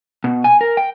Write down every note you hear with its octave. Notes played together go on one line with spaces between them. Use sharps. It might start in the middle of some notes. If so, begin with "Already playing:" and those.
B2
G#5
A#4
G5